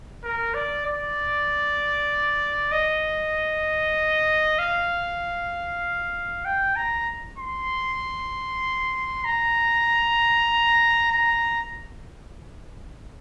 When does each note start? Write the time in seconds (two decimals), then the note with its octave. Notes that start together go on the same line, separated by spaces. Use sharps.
0.24 A#4
0.54 D5
0.85 D5
2.71 D#5
4.59 F5
6.45 G5
6.76 A#5
7.38 C6
9.24 A#5
11.11 A#5